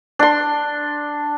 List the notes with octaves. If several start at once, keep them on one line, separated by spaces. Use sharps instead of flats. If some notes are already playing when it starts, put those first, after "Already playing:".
D4 C6